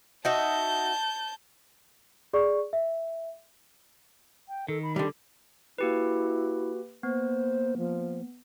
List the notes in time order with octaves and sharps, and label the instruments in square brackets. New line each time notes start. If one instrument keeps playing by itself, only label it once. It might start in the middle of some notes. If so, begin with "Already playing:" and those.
[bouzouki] D#4 F#4 E5 [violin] A5 G6
[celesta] G#4 D5 C#6
E5
[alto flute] G5
[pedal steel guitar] D#3 [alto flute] A4
[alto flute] B5
[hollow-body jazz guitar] D3 G3 [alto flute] G4
[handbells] A#3 G4 B4 [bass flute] E4 [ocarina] F#4
[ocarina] A#3 [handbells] B3 [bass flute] C5
[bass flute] F3